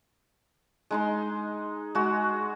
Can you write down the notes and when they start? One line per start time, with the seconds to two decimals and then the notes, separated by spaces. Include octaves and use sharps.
0.91 G#3 D#4 C6
1.95 G#3 F#4